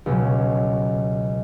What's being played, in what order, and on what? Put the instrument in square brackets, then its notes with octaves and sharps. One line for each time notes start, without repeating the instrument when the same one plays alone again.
[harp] C#2 B2 F#3